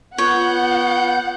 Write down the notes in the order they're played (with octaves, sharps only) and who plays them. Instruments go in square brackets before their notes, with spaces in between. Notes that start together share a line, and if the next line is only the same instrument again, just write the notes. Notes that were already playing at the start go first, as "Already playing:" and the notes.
[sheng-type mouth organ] B3 G6 [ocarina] F4 [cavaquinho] C#5 [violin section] F#5